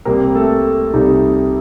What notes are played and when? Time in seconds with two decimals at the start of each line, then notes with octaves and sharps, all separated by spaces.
0.05 C2 C3 G3 A#3 C4 A#4
0.35 A3 A4
0.94 C2 C3 G3 C4 D#4